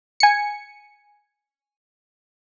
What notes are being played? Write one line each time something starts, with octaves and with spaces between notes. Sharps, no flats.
G#5 C#7